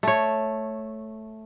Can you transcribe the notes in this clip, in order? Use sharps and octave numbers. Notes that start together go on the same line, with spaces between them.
A3 C#5